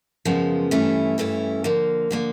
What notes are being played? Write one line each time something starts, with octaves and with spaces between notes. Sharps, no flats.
F#2 C#3 F3 G#3 B3
G2 E3 A3 C#4 E4
G2 E3 A3 C#4 E4
D3 F3 A#3
D3 F3 A#3